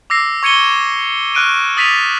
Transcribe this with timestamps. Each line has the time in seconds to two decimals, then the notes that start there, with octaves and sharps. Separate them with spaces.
0.10 D6 E6 A#6 C7
0.43 C#6 G#6 C#7 D#7 G7
1.35 C#6 F6 F#6 D7 D#7
1.77 D#6 A6 B6 D#7 F7